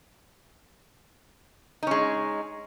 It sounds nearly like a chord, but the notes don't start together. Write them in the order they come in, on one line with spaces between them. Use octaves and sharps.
D#4 C#4 G#3